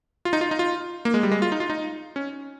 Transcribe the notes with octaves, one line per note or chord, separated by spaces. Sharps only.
F4
D#4
F4
D#4
F4
A#3
G#3
G3
G#3
F4
D#4
F4
D#4
C#4